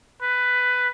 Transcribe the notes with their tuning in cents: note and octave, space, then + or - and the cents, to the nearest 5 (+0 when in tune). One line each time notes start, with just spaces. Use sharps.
B4 +10